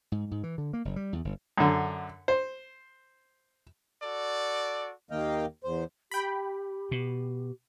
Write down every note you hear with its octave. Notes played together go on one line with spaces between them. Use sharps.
G#2
G#2
E3
D3
A#3
F#1
G3
E2
G1
F#2 D3
C5
F#4 A4 D5
D#2 D#3 A#3 D#5 F5 G5
E2 C5
G4 G5 B5
B2